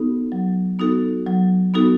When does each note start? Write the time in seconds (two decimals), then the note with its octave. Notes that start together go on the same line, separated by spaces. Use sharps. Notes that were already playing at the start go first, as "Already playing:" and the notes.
Already playing: B3 D#4 F#4 A4
0.32 F#3
0.79 B3 D#4 F#4 A4
1.27 F#3
1.74 B3 D#4 F#4 A4